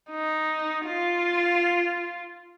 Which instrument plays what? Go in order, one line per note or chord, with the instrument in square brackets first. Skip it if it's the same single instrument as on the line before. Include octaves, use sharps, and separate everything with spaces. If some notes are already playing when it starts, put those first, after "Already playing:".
[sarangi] D#4
F4